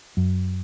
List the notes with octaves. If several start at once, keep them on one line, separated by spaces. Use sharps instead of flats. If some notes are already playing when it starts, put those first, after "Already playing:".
F#2